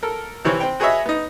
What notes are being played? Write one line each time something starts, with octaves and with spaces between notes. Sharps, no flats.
A4 A#4
C3 E3 C4 C#5
C4 G5
F#4 G#4 B4 C#5 D#5 E5
B3 D#4